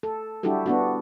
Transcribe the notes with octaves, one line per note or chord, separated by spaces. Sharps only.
A4
G3 D4 E4 F#4 G4 A4
B3 D4 F#4